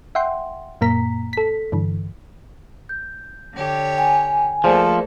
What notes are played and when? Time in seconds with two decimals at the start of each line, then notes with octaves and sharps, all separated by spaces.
0.15 E5 F#5 G5 C6
0.81 F#2 A#2 A#3 A#5 B6
1.33 A4 B6
1.72 G2 D3 E3
2.89 G6
3.55 D3 G4 C#5
3.98 G5 G#5
4.64 F3 A3 A#3 G#4 A4 C5 D5